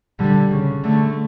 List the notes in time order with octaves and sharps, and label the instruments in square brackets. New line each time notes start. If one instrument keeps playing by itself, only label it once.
[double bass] D3 [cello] G3
[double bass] C#3
[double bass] D3 [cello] A3